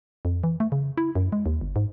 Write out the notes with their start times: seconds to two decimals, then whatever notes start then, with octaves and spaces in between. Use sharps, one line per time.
0.25 F2
0.44 E3
0.60 A3
0.72 C#3
0.97 E4
1.15 F#2
1.32 G#3
1.46 D#2
1.61 G1
1.76 G#2